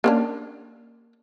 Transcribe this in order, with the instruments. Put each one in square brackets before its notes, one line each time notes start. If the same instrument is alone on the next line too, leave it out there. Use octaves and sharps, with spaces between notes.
[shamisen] A#3 C#4 D4